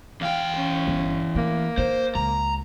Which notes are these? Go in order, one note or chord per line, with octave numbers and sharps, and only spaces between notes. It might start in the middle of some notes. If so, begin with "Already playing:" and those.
E2 F5 G5
C#4
G1
A3 A#3
D#4 C5
C#2 A#5